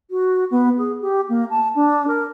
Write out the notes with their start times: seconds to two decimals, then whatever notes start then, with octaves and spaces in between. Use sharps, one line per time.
0.10 F#4
0.51 B3
0.78 G#4
1.01 G4
1.29 A#3
1.50 A5
1.75 D4
2.07 A#4